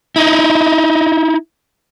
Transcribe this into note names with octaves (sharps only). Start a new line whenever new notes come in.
D#4 E4